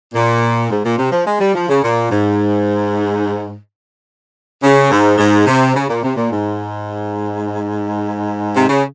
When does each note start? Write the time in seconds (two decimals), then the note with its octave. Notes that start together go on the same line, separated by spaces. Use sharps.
0.14 A#2
0.70 G#2
0.85 A#2
0.99 C3
1.12 F3
1.26 G#3
1.40 G3
1.54 F3
1.69 C#3
1.83 A#2
2.11 G#2
4.63 C#3
4.91 G#2
5.18 G#2
5.47 C3
5.75 C#3
5.89 A#2
6.03 C3
6.16 A#2
6.31 G#2
8.55 C3
8.68 C#3